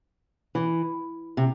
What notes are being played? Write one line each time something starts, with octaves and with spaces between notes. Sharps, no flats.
E3
C3